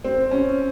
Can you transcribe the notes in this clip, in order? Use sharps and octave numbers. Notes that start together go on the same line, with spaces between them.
C4
C#4